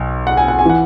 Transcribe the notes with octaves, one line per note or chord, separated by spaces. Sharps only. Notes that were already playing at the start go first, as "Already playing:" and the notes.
Already playing: B1
F#5
G#5
F#5
G#5
E3 F#5